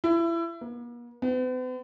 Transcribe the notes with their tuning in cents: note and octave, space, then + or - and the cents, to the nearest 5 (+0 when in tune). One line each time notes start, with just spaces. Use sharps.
E4 +30
A#3 +45
B3 +45